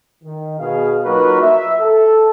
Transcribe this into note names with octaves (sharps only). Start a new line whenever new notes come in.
D#3
B2 G#4 F5
F#3 A#3 D#4 F4 F#4 B4
E5
A4